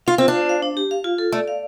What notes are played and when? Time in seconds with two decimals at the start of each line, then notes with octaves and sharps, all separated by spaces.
0.07 F4 F5
0.18 C4 F4
0.28 D4
0.35 C5
0.49 F5
0.62 D4
0.77 G4
0.91 F5
1.04 F4
1.18 A4
1.32 A3 D5
1.48 F5